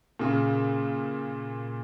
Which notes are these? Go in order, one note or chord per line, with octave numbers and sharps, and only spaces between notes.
A#2 C#3